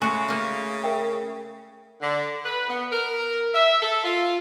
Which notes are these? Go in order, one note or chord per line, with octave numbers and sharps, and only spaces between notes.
C#3 G#3 A3 F#4 G#5
A#3 D#4
A#4 E5 G5
D3
B4
B3
A#4
E5
A4
F4